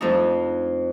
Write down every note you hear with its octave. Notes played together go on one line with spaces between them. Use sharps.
F2 A3 D4 D#4